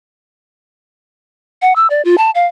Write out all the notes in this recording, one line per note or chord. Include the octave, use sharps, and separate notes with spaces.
F#5
E6
D5
F4
A5
F5